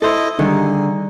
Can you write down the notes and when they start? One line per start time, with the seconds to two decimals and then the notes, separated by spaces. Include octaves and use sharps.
0.02 E4 A4 C5 D#5
0.39 D3 D#3 G3 D#4 G#4